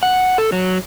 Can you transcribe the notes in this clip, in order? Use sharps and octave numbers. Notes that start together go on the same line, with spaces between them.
F#5
A4
F#3